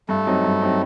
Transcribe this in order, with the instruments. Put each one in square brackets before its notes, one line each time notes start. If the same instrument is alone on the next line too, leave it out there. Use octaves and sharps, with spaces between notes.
[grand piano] G2 [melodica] A3
[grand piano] F#3 C4 D#4
G2
F#3 C4 D#4